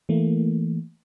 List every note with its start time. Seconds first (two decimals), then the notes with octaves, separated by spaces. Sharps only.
0.09 E3 A3 A#3